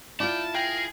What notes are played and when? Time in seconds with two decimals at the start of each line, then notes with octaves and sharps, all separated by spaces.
0.20 E4 F4 D5 G5 A5
0.54 G#4 A#4 G5